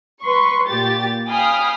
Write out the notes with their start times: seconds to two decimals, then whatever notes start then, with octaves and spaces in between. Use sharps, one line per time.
0.23 B4 C6 C#6
0.69 A#2 G4 A6
1.29 F5 G5 G#5 B5 D#6 F6